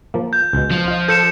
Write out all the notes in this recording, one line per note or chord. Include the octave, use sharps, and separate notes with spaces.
F3 A#3
G6
C#2 B2
F3
F4 D#5
A4 C5 G6 C#7 E7